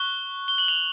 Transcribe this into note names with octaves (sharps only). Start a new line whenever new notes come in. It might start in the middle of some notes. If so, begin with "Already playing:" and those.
Already playing: C#6 F#6 G7
G7
F#7
F7